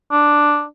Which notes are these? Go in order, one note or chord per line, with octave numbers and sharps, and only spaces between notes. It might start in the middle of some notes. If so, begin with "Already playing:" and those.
D4